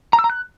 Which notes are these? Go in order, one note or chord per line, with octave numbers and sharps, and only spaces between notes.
A#5
E6
A#5
F#6